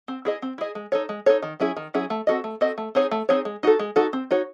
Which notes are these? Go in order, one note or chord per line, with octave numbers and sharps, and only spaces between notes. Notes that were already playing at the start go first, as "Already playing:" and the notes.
C4
E4 G#4 D#5
C4
E4 G#4 D#5
G#3
D#4 A4 C#5
G#3
D#4 A4 C#5
D#3
F#3 C#4 E4 G#4
D#3
F#3 C#4 E4 G#4
A3
C4 F#4 A4 D#5
A3
C4 F#4 A4 D#5
A3
C4 D#4 G#4 C#5
A3
C4 D#4 G#4 C#5
G#3
D#4 F#4 A4
G#3
D#4 F#4 A4
C4
D#4 F#4 C#5